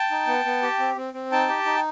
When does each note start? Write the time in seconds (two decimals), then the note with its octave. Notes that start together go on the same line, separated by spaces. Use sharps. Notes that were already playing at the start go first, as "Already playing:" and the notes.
Already playing: G5 A5
0.11 D#4
0.27 B3
0.45 B3
0.62 G4
0.79 C4
0.96 C4
1.14 C4
1.32 D#4 G5 A5
1.49 G4
1.65 D#4